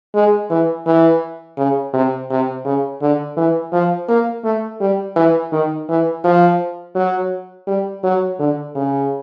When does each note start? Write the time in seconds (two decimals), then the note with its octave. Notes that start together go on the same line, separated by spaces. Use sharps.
0.14 G#3
0.50 E3
0.86 E3
1.58 C#3
1.94 C3
2.30 C3
2.65 C#3
3.02 D3
3.37 E3
3.73 F3
4.08 A#3
4.44 A3
4.81 G3
5.16 E3
5.52 D#3
5.89 E3
6.24 F3
6.95 F#3
7.67 G3
8.04 F#3
8.39 D3
8.75 C#3